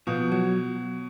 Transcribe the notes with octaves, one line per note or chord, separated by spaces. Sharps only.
B2 F3
F#3